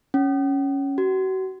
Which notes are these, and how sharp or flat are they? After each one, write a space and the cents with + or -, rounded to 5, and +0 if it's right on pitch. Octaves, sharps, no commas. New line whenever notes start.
C#4 +0
F#4 +35